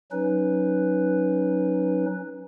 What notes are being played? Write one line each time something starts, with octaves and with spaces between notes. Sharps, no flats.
F#3 C#4 D#4 B4